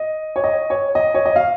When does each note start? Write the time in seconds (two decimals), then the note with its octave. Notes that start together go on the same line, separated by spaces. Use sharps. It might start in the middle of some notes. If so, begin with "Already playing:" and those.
Already playing: D#5
0.36 C#5
0.44 D#5
0.70 C#5
0.95 D#5
1.14 C#5
1.26 D#5
1.36 F5